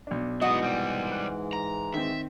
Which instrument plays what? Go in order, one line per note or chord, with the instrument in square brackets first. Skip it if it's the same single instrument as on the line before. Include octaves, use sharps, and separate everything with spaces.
[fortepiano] B1 D4
[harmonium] G#2 E3 G#3 [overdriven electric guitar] F#3 B3 [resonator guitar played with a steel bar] F#4 D#5
[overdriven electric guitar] C2 G3
[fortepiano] F#6
[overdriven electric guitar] A#5
[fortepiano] D#3 C4 [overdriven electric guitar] E5